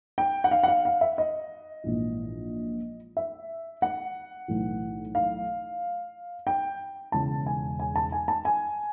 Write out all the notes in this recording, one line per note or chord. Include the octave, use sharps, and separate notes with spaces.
G5
F#5
F5
F#5
F5
F5
E5
D#5
A#1 G#2 E3
E5
F#5
B1 A2 E3
F5
G5
E1 E2 C#3 E3 A5
G#5
G#5
A5
G#5
A5
G#5